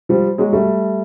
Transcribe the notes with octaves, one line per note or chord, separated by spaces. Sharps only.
F3 G3
F#3 G#3
G3 A3